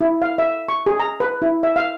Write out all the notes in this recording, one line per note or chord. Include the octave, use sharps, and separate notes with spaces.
E4
F5
E5
C#6
G#4
A#5
B4
E4
E5
F5